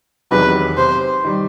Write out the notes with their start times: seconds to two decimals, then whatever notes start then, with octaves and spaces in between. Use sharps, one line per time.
0.31 E2 C3 D#3 F#3 B4
0.78 C3 C5
1.24 D#3 G3